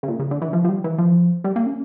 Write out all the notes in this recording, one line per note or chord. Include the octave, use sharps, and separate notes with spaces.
C#3
A#2
C#3
D3
E3
F3
F3
G3
E3
F3
G3
A#3
C#4